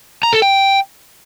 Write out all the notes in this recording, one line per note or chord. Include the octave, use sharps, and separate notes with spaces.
A#5
A4
G5